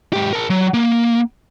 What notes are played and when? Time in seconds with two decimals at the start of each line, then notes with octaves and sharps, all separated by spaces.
0.13 G#2 G4
0.33 A#4 A5
0.50 F#3
0.74 A#3